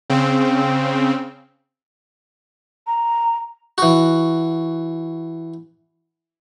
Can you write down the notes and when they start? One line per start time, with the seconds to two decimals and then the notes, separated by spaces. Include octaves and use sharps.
0.10 C#3 C4
2.87 A#5
3.78 E3 F#4